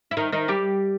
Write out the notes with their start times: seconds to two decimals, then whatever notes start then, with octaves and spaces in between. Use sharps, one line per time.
0.11 E4
0.17 D#3 D#4
0.32 D#3 D#4
0.48 G3 G4